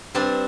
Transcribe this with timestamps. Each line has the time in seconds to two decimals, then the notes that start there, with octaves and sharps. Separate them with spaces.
0.15 G2 C4 D4